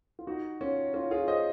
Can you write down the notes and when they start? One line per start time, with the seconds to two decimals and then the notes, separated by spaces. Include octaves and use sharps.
0.19 F4
0.27 D#4 F#4
0.61 C#4 F4
0.94 C#4 F4
1.11 F4 G#4
1.28 C5 D#5